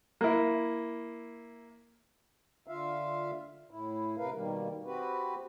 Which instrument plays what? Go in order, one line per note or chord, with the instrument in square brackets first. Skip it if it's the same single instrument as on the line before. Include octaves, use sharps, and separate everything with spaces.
[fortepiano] A#3 E4
[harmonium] D3 F4 E5 F5
A2 E4
C3 A#4 B4 F5
B2 D#3 G3 A#3
C4 F#4 G4 B4